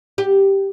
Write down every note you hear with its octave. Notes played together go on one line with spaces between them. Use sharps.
G4